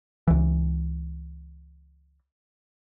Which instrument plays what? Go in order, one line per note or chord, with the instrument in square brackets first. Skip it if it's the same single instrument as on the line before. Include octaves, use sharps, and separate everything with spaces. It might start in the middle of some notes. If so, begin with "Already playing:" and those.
[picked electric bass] C#2 E3